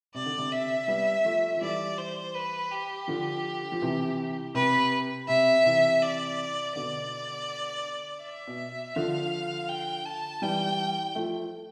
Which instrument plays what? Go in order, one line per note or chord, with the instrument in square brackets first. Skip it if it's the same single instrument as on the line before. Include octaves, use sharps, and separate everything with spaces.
[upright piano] C3 [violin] D5
[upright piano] D3
C3
[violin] E5
[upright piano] G3 B3
F3 A3
F3
[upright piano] E3 G3 [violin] D5
[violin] C5
B4
G4
[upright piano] D3 F3
F3
C3 E3
[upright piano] C3 [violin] B4
[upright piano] C3 [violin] E5
[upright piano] C3 E3
[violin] D5
[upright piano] B2 D3 [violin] D5
[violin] E5
[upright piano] B2
[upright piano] D3 F3 [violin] F5
[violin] G5
A5
[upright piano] E3 G3 [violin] G5
[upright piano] F3 A3